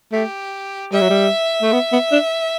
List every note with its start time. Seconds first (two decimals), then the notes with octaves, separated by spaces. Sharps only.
0.12 A3 G4
0.92 G3 E5
1.01 F#3
1.10 G3
1.62 A3
1.73 B3
1.92 B3
2.12 D4